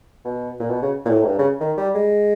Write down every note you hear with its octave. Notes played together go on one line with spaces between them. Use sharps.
B2
A#2
B2
C#3
A#2
A2
G#2
G2
C#3
D#3
G3
G#3